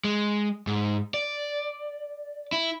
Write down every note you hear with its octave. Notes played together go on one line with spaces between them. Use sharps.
G#3
G#2
D5
E4